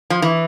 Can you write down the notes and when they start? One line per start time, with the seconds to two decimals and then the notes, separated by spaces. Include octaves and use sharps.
0.10 F3
0.22 E3